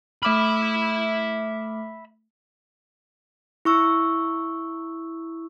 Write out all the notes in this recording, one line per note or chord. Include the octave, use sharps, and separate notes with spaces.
A3 E5 B5 D6 F6
E4 C#6 E6